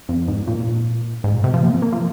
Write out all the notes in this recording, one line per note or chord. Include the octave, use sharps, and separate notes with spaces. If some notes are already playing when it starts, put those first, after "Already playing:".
F2
G#2
A#2
G#2
A#2
C3
F3
A#3
C4
A#3
F3